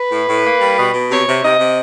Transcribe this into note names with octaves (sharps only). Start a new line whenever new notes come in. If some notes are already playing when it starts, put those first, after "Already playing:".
Already playing: B4
A2
A2
A#3
G3
B2
B2
C3 C#5
C3
C3 D#5
C3